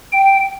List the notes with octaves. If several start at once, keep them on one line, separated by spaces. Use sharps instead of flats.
G5